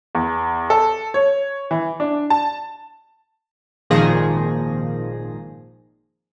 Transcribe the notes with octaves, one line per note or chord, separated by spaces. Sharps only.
E2
A4
C#5
E3
D4
A5
G#1 A#2 D#3 F3 G#4 A#6